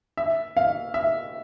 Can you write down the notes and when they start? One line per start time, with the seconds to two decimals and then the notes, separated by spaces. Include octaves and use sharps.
0.17 E5
0.57 F5
0.94 E5